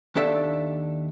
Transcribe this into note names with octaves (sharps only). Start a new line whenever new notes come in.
D#2 D4 A4 D5 E5